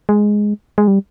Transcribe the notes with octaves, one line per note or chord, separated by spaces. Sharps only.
G#3
G#3
G3